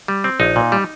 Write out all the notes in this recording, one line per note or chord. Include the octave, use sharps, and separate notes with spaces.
G3
C4
A#1 D#4
A#2
G3